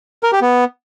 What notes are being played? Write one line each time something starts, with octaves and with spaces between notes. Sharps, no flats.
A#4
G4
B3